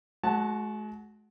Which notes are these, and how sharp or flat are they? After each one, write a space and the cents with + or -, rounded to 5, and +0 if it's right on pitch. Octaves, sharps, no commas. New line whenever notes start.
G#3 +45 F#4 +0 A5 +0